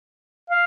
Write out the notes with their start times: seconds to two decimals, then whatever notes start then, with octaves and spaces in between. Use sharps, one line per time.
0.50 F5